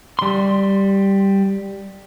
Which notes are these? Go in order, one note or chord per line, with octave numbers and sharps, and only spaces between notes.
G3 C6